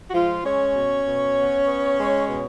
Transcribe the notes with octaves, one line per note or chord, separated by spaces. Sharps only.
F#4
F3 G#3 F4
G#3 C#4 C#5
B2
B2
B3
B3
G#3
B2